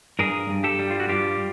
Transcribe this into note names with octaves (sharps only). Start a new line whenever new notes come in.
G2 G#4 A#4
G2
G4 A4
G3
F4
F#4
G2 F4 G4